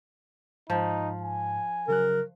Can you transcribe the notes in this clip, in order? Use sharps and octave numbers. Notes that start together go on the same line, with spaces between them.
G#2 F3 D#4
G#5
C#3 F#3 A#4 F#6